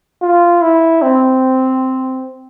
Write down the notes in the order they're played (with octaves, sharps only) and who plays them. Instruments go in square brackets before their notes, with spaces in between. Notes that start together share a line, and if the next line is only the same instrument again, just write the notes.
[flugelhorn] F4
E4
C4